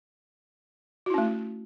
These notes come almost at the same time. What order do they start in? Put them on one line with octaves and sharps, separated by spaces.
F#4 E4 C#4 A3